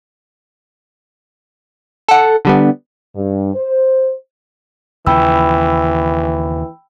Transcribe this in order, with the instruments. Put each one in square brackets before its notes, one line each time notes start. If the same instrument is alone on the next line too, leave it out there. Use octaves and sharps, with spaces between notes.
[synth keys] A4 F#5
D3 G3 B3
[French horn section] G2
C5
[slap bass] D#2 C#3 F3 [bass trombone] E3 [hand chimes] G5 B5 E6